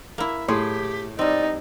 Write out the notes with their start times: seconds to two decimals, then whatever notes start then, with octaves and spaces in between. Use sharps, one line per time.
0.18 A#3 E4 E5
0.48 A2 G4 G#4 C6
1.19 G3 C4 D#4 D5